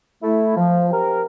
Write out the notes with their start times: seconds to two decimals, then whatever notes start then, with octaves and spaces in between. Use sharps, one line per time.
0.23 A3 E4
0.57 F3
0.90 C4 G4 A#4